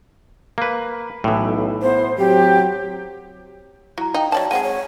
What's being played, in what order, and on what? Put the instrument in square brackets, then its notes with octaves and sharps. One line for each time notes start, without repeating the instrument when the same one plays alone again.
[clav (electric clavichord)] A#3 B4
[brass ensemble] B1 [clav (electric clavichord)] A2 E3
[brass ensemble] B3 E4 [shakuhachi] C5
[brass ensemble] F#3 C4 [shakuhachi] G4
[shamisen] F#3 [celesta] E4 A#5
[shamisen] D#4 [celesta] F5 G5
[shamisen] F#3 D5 A5 [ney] C#5
[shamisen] G#3 C4 G#4 [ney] F#5 [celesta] D#7
[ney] C#5